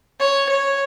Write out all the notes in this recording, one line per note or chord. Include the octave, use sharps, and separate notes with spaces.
C#5
C#5